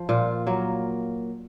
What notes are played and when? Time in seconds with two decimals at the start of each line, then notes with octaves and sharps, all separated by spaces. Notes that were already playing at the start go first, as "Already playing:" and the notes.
Already playing: F3
0.09 A#2 F4
0.47 F#3 A#3